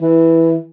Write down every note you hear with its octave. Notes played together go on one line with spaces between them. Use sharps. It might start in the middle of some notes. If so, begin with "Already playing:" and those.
E3